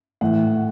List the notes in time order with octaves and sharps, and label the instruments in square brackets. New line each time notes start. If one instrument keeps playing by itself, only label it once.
[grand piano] A2 E3 F#5